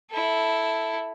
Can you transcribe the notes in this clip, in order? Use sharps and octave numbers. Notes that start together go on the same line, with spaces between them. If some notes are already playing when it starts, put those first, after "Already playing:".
E4 A4